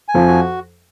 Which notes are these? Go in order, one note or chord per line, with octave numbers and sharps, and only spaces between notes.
G#5
F2 F3
F#4